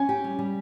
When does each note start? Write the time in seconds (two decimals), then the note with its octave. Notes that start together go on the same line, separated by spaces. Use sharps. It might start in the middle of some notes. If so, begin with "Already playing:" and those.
Already playing: C#4 G#5
0.09 G4
0.24 G3
0.39 G3